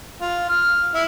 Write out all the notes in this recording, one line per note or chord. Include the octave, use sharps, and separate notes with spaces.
F4
F6
E4